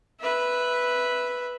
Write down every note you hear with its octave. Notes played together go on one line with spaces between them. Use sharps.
B4 E5